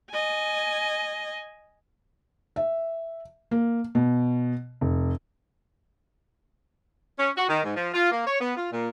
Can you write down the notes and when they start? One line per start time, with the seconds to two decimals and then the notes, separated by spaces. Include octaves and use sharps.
0.11 D#5 G#5
2.56 E5
3.51 A#3
3.95 B2
4.81 F1
7.18 C#4
7.37 F#4
7.48 D#3
7.64 G#2
7.75 F3
7.93 F4
8.11 A#3
8.26 C#5
8.40 B3
8.56 F4
8.72 A#2